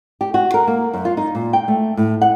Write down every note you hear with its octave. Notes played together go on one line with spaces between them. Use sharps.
G4
F#4
A#4
A#3
F#2
F4
D#4
A#2
G5
A3
A2
F#5